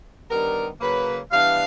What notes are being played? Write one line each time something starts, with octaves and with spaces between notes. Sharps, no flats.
G2 D#3 G3 B3 D4 A#4
C#3 F#3 A#3 B4
E3 G3 B3 D4 F5